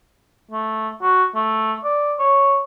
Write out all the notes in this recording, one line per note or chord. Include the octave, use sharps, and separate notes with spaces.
A3
F#4
A3
D5
C#5